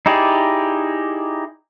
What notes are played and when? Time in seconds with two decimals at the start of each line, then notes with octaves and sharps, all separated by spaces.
0.06 D#4 E4 G4 G#4 D5